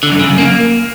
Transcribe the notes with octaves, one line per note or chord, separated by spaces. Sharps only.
D3
F#2
C#3
F#2
A#3